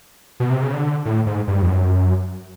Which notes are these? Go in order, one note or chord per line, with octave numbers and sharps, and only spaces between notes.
B2
C3
C#3
D3
A2
G#2
G2
F2
F#2